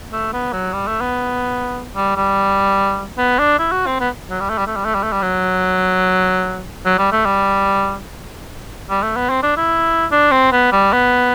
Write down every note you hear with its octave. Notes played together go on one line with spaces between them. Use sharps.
A3
B3
F#3
G3
A3
B3
G3
G3
B3
D4
E4
F#4
C4
B3
F#3
G3
A3
G3
A3
G3
A3
G3
A3
G3
F#3
F#3
G3
A3
G3
G3
A3
B3
C4
D4
E4
D4
C4
B3
G3
B3